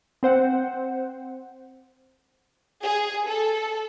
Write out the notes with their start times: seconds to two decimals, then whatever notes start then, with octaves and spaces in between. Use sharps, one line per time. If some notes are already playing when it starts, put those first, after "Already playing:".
0.23 C4 C5 F#5
2.83 G#4
3.26 A4